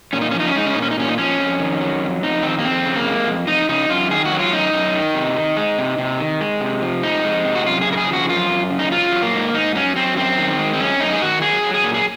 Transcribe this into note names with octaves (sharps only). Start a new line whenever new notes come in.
A#2 C#4
D#4
F3 C#4
D#4
C#4
G#3 D#4
C#4
A#2 D#4
C#4
D#4
A#2 C#4
D#4
F3 C#4
F2
D#3
F#3
F2
F2 D#4
D#3 C4
A#3
F2 C4
C#3
A#3
G#3
F2
F2 D#4
C#3 D#4
F#2 F4
D#3 G#4
F#4
F#3
F4
F#2 D#4
F#2
D#3
C3
D#3
G#3
C3
C3
D#3
G#3
C3
F3
F2 D#4
G#3
C3
F#4
F#2 F4
G#4
C#3
A#4
G#4
F3
F#4
F#2 F4
F#2
C#3
D#4
F#3 F4
F#3
A#3
G#2
G#2 D#4
F#3 C#4
F#3 C4
F#2 C4
D#3
G#3
C4
F#2 C#4
F#2 D#4
G#4
D#3 F#4
F#3 G#4
F#3
G#4
A#2
G#4